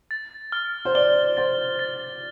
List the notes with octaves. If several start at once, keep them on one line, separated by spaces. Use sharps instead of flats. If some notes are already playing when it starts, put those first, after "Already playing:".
A6
F6
C5
D5 G7
C5 A6
A6